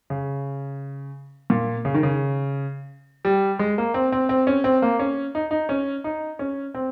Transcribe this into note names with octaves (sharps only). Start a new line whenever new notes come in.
C#3
A#2
C#3
D#3
C#3
G3
G#3
A#3
C4
C4
C4
C#4
C4
A#3
C#4
D#4
D#4
C#4
D#4
C#4
C4